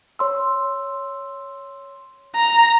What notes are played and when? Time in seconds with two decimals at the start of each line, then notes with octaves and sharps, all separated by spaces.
0.19 C#5 C6 E6
2.36 A#5